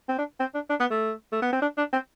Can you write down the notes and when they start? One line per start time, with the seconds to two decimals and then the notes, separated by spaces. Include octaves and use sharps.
0.09 C4
0.18 D4
0.40 C4
0.54 D4
0.70 D4
0.80 B3
0.91 A3
1.32 A3
1.42 B3
1.53 C4
1.62 D4
1.78 D4
1.93 C4